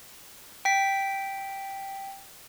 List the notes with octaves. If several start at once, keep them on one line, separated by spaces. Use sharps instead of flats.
G5 B6